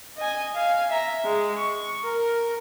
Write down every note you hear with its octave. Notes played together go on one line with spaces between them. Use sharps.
D#5 G#5
F5 G#5
E5 A#5
G#3
C#6
A#4